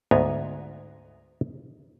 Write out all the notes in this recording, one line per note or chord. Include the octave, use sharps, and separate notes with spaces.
D2 G#2 B3 G#5 A#5